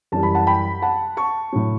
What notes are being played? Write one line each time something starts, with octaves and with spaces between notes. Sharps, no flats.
F#2 E3 G3 A5
B5
F#5 A5
G5 B5
F#5 A5
A5 C#6
A2 F#3